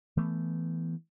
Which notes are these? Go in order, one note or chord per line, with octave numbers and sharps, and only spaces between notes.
E3 A3 B3